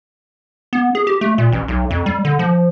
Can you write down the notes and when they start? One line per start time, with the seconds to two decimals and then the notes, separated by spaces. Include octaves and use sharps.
0.73 B3
0.95 G#4
1.07 G4
1.21 A3
1.38 A#2
1.52 A1
1.68 B1
1.91 F2
2.06 G3
2.25 D3
2.39 F3